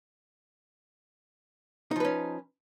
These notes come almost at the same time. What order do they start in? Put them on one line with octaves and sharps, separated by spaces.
D#4 F3 B4 C#4